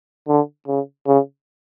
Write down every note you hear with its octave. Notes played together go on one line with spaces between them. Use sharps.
D3
C#3
C#3